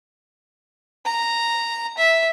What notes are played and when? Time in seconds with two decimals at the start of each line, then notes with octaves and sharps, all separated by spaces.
1.05 A#5
1.98 E5